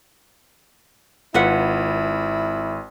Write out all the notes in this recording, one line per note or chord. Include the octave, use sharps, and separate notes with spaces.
G#1 E4 F4 B4 F#5